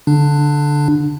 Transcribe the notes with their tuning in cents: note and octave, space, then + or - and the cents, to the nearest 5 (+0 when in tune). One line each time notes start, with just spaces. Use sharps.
D3 -20 D4 +15